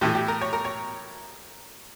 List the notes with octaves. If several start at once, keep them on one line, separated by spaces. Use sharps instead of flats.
A2 E3 A3 E4 G4
G4
A#4
C#5
A#4
C#5